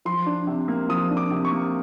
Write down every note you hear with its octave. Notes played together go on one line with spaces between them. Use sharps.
F3 C6
D4
C3
A#3
F3 D#6
D4
D6
C3
C#6
A#3